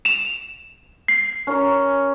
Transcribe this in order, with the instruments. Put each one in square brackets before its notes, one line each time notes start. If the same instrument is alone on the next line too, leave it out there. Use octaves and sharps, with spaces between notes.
[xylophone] E7 F7
C7
[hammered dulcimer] C#4 A#4 C#6